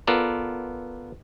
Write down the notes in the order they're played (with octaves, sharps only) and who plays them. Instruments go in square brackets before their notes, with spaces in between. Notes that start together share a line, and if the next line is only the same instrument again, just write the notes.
[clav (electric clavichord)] B3 F4 A4 A#4 D5